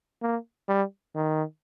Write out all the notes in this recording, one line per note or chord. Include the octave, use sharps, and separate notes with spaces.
A#3
G3
D#3